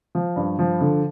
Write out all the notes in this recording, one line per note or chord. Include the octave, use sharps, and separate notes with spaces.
F3
G2
F3
D3